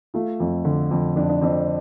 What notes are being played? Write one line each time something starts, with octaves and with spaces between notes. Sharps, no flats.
A3 F4
F2
D3
F2
F2 D4
D4
F2 C4